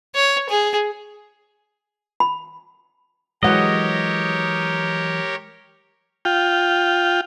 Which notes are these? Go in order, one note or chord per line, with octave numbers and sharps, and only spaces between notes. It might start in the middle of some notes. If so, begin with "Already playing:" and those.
C#5
G#4
B5
E3 F#3 G#3 G4 A#4 C#5 D#5 F#5
F4 G5